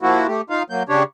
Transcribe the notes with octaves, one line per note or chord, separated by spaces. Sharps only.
F3 A#3 E4 F#4
A3 G4
D#4 F4 F5
F#3 A#3 G6
C#3 D4 G4 C#5